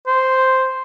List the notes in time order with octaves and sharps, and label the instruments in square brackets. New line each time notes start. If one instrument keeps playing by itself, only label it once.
[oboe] C5